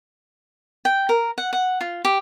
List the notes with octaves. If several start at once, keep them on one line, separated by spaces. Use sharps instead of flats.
G5
A#4
F#5
F#5
F4
G4